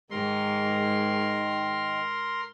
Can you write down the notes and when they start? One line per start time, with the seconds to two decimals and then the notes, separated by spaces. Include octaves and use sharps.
0.11 G#2 D#3 A#4 C6